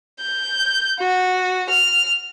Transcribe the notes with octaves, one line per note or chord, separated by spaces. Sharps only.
G6
F#4
F6